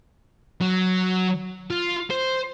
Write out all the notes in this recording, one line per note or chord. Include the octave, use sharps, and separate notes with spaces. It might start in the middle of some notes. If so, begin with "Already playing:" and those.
F#3
F4
C5